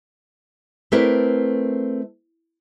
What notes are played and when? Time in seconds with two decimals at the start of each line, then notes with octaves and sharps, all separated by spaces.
0.92 A3 C4 E4 A#4 B4 D5